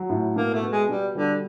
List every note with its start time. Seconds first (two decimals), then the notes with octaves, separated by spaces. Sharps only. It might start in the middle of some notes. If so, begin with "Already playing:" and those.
Already playing: F#3
0.10 A2
0.36 B2 A#3
0.54 A3
0.63 B3
0.72 G#3
0.89 B2 G3
1.15 D3 G3